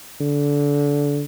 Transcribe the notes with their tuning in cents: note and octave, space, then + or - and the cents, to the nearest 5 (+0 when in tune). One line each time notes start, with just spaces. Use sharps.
D3 -25